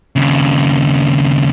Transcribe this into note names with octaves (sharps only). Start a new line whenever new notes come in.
D#2 C#3